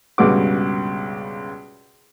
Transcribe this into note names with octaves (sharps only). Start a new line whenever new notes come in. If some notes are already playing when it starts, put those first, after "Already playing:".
C#2 G2 B2 F#4 B4 D6